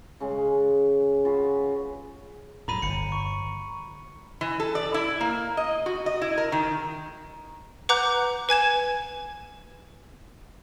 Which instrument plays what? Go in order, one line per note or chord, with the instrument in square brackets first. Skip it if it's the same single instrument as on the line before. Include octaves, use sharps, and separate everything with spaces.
[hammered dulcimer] C#3 G#3
F4 F#4 G#4 B4
[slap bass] F#2 A2 [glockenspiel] A#5 B5 D#7
[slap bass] G1 [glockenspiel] C#7
[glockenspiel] C#6
[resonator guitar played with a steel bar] E3
A4
D5
E4
A#3
D#5
F#4
D#5
E4
A#4
D#3
[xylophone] B4 F#5 A#5 D6 F#6 G6
B4 G#5 G#6 E7